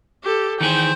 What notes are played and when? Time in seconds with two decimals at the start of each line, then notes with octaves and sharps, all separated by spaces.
0.23 G4 A4
0.61 D#3 E3 G#4 C5 G5